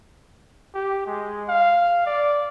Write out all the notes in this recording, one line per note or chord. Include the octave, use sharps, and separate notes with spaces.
G4
G#3
F5
D5